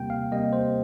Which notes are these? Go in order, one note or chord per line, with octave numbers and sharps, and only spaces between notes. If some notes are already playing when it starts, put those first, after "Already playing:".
Already playing: C3 G3 A#3 G5
F5
C3 G3 A#3 D#5
C5